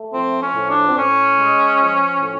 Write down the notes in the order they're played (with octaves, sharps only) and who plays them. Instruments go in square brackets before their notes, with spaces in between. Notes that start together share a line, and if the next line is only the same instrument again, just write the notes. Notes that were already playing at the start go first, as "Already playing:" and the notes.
Already playing: [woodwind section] A3
F3 C4
C#4
A2
D4
C4
A2 C#4
G#3
F3
A2